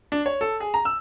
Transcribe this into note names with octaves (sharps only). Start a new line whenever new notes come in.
D4
C#5
A4
G#4
A#5
E6